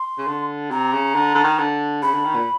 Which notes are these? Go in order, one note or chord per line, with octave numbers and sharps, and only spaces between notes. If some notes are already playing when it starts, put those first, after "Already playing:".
Already playing: C6
C#3
D3
C3 A#5
C#3
D3
D3
D#3
D3
C#3 B5
D3
D#3
A#2